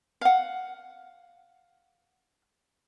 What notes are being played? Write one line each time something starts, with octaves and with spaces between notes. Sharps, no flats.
F5 F#5